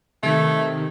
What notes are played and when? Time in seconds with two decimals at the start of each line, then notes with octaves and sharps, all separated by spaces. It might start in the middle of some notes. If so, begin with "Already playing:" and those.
0.23 C3 D#3 A3 E5 G#6 B6